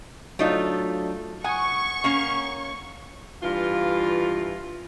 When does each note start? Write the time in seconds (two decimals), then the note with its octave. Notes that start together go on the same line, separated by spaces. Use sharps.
0.39 F#3 A3 D4 D#4 F4 A4
1.44 F#5 G#5 C#6 D#6 G#6
2.04 A#3 C#4
3.43 G2 E3 F4